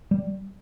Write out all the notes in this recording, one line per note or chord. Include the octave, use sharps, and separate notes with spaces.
G3